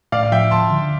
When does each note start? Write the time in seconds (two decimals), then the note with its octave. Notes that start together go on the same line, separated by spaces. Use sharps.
0.12 A2 D5 F5
0.23 F5
0.32 F3 E5 G5
0.51 D2 A5 C6
0.71 D3